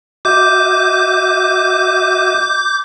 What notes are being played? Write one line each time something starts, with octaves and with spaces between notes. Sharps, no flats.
F#4 D#5 E5 D6 G6